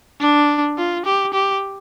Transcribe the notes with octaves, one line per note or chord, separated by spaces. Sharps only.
D4
F4
G4
G4